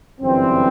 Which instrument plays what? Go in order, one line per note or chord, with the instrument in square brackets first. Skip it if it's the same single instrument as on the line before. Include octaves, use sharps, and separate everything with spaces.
[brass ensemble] G1 F#2 E3 G3 C4